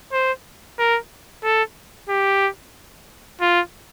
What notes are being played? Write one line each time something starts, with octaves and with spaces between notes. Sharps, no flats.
C5
A#4
A4
G4
F4